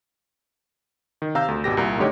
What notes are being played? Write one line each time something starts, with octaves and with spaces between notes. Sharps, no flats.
D#3
C3 F5 A#5 E6 G6
D2
G#1 B2 G4 A#6
C2 A#2 A#5
F#2 D3 A3 D#4 G4 C#5